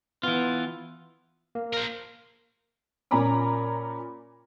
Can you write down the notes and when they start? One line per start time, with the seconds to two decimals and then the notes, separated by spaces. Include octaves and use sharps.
0.23 E3 B3 F4
1.55 A#3
1.73 A#4 C5
3.11 A#2 C#4 G#5 A#5 B5 D6